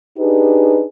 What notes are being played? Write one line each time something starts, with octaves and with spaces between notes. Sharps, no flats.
D4 D#4 G4 G#4 B4